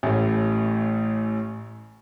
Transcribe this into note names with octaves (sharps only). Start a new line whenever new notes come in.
A1 A2